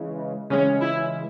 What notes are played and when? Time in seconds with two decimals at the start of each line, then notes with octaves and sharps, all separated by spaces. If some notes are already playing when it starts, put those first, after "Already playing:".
Already playing: C#3 E3 G#3
0.50 C#3 E3 G#3 C#4
0.81 E4